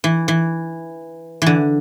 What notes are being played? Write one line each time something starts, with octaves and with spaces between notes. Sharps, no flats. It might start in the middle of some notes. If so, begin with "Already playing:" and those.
E3
E3
D3 E3